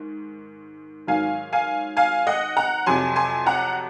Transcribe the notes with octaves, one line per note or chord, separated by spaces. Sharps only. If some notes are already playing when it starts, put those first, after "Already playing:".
Already playing: G#2 D#3
G#2 D#3 F#3 F5 G#5
F5 G#5
F5 G#5
D#5 F#5
F#5 A#5
F2 C3 F#3 G#5 C6
G#5 C6
F#5 A#5